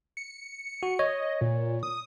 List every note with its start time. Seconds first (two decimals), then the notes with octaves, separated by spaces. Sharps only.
0.17 C#7
0.83 F#4
0.99 C#5 D#5
1.41 A#2
1.83 D#6